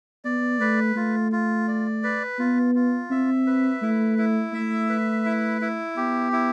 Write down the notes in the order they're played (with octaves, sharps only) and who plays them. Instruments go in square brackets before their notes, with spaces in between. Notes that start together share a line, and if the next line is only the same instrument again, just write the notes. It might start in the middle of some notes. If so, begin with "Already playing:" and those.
[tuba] B3 [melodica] D5
[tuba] A3 [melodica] B4
[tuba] A3 [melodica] F4
[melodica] F4
D5
B4
[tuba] B3 [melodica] F4
[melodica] F4
[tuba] C4 [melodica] E5
[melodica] B4
[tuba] A3 [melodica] E4
[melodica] E4
[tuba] A3 [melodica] E5
[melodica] B4
E4
E4
[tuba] B3 [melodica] G4
[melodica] E4